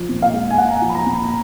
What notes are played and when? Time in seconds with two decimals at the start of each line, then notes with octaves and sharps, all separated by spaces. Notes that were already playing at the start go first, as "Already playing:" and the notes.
Already playing: F3
0.09 A#2
0.22 F5
0.34 G#3
0.50 G#5
0.58 A#2 F#5
0.68 A#5
0.75 G#5
0.82 F3
0.90 B5
0.95 A#5
1.06 A#2
1.13 B5
1.25 A#5